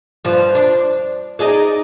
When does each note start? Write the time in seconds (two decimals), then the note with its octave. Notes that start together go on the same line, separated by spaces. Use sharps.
0.25 G2 F3
0.55 D4
1.39 D#4 G#4 D5